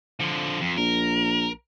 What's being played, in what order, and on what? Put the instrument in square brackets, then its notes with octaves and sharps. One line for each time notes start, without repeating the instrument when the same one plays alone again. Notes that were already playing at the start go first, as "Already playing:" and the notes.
[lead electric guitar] D3 F3
F2
[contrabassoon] A#1 [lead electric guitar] A#4